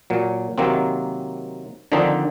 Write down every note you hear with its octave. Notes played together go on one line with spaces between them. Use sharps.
A#2 F#3
C3 D#3 F#3 A#3 C4
D3 D#3 F3 C4 D4 D#4